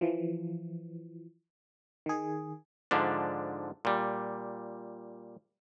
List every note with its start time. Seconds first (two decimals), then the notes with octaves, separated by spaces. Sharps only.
0.01 E3 F3
2.06 D#3 G#4
2.91 G#2 D3 F3 D4
3.85 A#2 G3